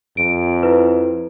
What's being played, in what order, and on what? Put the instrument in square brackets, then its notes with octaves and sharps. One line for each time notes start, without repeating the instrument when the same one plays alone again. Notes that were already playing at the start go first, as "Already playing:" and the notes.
[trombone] F2 [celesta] D7
[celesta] E4 B4